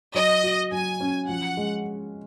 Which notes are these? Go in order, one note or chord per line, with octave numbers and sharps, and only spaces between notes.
F#3 D#5
F#4
F#3 G#5
C#4
F3 F#5
G#3